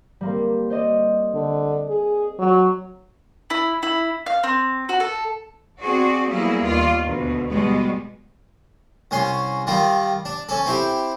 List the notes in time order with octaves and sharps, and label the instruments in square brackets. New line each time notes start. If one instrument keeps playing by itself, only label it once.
[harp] G3 A#3 C4
C5 D5 D#5
[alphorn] D3
G#4
F#3
[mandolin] E4
E4
F5
C4
F#4
A4
[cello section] C4 F#4 G#4 D5
F#3 G3 A#3 B3 E4 G#4
D#2 F4 D5
D2 B2
B2 G3 G#3
[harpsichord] C2 C#4 C6
D#3 G3 F4
D4
C#4 A4
C4 E4 G4